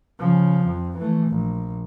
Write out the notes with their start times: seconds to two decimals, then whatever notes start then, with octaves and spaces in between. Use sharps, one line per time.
0.19 C#3 F3
0.64 F2
0.98 E3 A3
1.28 A#1